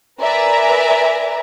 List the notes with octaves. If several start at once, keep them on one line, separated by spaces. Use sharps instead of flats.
A#4 B4 D5 E5 G#5 A#5